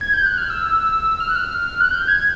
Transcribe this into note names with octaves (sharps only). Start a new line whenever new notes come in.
G#6
G6
F#6
F6
E6
F6
F#6
F6
F#6
G6
G#6